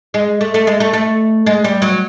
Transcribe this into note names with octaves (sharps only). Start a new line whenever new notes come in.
G#3
A3
A3
G#3
A3
A3
G#3
G3
F#3